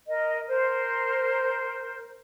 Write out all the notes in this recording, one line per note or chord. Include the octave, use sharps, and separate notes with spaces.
A#4 D#5
A#4 C5